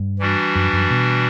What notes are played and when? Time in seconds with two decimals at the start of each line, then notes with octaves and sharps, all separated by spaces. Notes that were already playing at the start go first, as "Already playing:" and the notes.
Already playing: G2
0.19 E3 G3 D4 F#4
0.55 F#2
0.73 F#2
0.91 B2